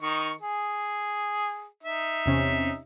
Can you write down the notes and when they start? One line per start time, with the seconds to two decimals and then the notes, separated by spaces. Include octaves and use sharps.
0.02 D#3 D#4 C#6
0.41 G#4
1.83 D#4 E5
2.26 E2 C3 C#4